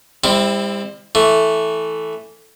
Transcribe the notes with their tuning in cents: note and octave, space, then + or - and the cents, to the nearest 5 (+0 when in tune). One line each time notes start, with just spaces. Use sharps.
G3 +40 C4 +0 E4 +0
E3 +0 A3 +0